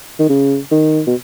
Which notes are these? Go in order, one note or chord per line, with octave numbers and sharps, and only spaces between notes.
D#3
C#3
D#3
B2